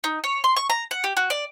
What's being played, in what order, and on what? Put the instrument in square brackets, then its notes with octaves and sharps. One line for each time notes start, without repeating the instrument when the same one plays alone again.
[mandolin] D#4
C#5
C6
C#6
A#5
F#5
G4
F#4
D5